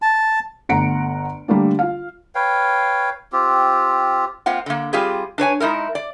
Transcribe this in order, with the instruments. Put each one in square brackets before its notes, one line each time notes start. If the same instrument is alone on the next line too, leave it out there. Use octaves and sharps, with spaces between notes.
[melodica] A5
[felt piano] G1 A3 F#5 A#5 C#7 D7
D3 G3 A3 A#3 D4
F4 F5
[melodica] B4 C#5 F5 G5
C4 F4 G4
[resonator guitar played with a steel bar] A#3 C4 F4 F#5
D3 A#3
G3 C4 F4 G4 G#4
D4 B4 C#5 G#5
G#3 D#4 E4 A#4
D5